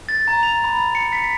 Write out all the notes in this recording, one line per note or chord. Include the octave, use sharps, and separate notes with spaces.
A6
A#5
F7
B5
C#7
B6